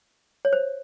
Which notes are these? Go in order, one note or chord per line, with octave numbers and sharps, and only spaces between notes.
C#5
C5